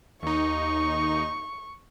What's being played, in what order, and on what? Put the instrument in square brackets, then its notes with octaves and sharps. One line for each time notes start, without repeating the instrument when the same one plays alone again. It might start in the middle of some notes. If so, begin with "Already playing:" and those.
[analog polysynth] D#2 D#4 [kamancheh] C#6